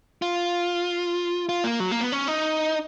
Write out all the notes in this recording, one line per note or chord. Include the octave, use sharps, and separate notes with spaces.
F4
F4
A#3
F#3
A#3
B3
C#4
D#4